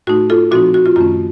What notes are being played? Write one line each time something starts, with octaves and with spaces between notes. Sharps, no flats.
A2 A3 D#4 F#4
F4 A4
A#2 F3 C4 D#4 F#4
F#4
F4
F#2 D#3 A3 C#4 F4